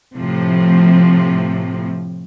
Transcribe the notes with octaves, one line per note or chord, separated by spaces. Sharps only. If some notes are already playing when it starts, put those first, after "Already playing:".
A2 C3 F3